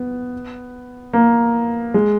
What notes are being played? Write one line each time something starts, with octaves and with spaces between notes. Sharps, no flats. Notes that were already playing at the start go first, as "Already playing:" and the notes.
Already playing: B3
A#3
G#3